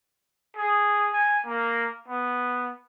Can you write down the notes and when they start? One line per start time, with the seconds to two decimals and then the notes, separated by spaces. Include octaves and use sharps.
0.56 G#4
1.13 G#5
1.46 A#3
2.08 B3